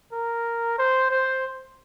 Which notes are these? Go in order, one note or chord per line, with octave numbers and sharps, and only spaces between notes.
A#4
C5
C5